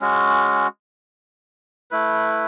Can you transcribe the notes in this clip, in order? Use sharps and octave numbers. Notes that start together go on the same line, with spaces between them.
G#3 C#4 F#4
A3 E4 B4